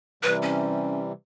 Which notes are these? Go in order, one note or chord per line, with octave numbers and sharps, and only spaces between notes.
C3 E3 G3 B4
C#4